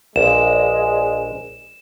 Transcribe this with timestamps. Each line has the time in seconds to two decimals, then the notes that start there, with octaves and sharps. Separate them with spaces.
0.16 A#1 G#3 B4 D5 F5 E7